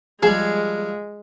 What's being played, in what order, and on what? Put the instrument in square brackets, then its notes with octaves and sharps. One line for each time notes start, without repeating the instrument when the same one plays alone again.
[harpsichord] F3 G3 [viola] G#3 [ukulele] G#4